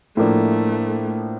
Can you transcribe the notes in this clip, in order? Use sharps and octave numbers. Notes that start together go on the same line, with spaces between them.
A2 F3 A3 A#3 D4